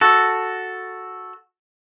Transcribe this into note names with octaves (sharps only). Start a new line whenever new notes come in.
F#4 A4